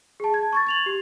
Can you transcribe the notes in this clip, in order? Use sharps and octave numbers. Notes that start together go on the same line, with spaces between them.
G#4 A5
G#6
C#6 G#6 A6
G#6 F7 F#7
G4